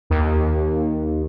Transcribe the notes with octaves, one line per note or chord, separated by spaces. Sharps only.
D#2